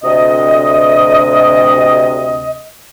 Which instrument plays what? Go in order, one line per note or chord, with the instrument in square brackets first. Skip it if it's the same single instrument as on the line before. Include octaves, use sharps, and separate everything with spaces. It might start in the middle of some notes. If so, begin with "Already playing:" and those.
[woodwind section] D2 C3 D#5